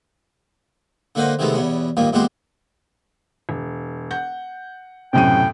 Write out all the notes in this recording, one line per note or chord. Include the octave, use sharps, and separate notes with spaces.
D3 A#3 F#4 B4 C5 D#5
C3 D#3 F#3 G#3 A3 B3
E2 B2 G3 C#4
G2 A#2 D#3 F3 A#3
E2 A#2 G#3 F#4 G4 C5
E1
F#5 G6
B1 F#2 A2 C3 G5 D#7